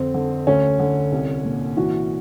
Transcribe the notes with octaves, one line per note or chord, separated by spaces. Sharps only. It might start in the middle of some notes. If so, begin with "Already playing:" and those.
Already playing: F2 D3 C4
D3
D2 C#4
D3
C2
A#2
E3 F#4